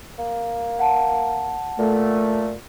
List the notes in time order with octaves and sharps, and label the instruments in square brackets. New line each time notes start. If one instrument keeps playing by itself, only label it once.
[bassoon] A#3
[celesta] F#5 A5
[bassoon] A#2 [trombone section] A3